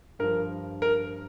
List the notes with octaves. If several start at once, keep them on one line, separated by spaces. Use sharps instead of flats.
G2 F3 A#4
A#4